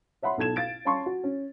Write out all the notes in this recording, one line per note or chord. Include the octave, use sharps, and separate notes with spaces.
C#5 E5 F#5 B5 C6
B1 A4 A5 G#6 E7
F5 A6 D7
C#4 F5 A5 C6 C#6
F#4
C#4